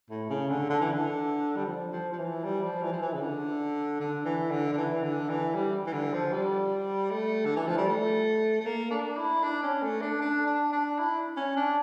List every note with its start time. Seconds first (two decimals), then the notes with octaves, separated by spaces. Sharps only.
0.10 A2
0.30 C#3
0.50 D3
0.70 D3
0.81 E3
0.94 D3
1.56 G3
1.66 F3
1.92 F3
2.13 F3
2.18 E3
2.44 G3
2.63 F3
2.83 E3
2.93 F3
3.02 E3
3.14 C#3
3.21 D3
4.00 D3
4.25 E3
4.51 D3
4.73 D3
4.77 E3
5.03 D3
5.29 E3
5.55 G3
5.87 E3
5.93 D3
6.13 F3
6.33 G3
7.11 A3
7.46 D3
7.56 E3
7.67 F3
7.78 G3
7.88 A3
8.61 A3
8.66 A#3
8.91 D4
9.17 E4
9.43 D4
9.63 C#4
9.82 A3
10.01 D4
10.21 D4
10.46 D4
10.73 D4
10.99 E4
11.37 C#4
11.57 D4